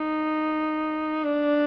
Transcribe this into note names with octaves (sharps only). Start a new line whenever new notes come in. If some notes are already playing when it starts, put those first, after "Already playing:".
Already playing: D#4
D4